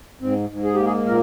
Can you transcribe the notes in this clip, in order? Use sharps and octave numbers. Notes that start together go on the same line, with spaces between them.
G#2 C4
G#2
G#4
A#3 G4
G#4
A#2 A#4